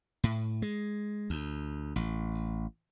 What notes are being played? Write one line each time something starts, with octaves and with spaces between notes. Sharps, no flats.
A2
G#3
D2
A1